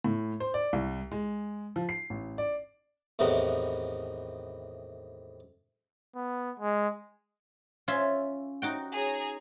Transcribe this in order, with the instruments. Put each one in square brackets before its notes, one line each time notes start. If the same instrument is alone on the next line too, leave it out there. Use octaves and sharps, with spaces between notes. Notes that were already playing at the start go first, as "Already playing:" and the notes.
[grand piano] A2
C5
D5
C2
G#3
F3
C7
A1
D5
[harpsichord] E2 A2 C3 D#3 B3
[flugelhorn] B3
G#3
[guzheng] C#4 F4 E5
D#4 F#4 G5
[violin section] G#4 C#5 A#5